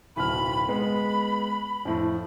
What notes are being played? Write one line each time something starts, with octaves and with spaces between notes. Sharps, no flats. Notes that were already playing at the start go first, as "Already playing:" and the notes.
D1 B1 B5 F6
G#3 B3 B5
F2 A2